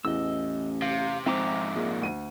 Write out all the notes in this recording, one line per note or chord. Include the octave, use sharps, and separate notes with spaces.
A1 E2 D#5 E6
C3 F5
F2 G#2 C4 E5 A#5 D6
A#2 G#3
D2 D#7